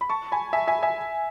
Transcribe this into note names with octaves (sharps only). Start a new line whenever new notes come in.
B5
A5 C#6
G#5 B5
E5 G#5
E5 G#5
E5 G#5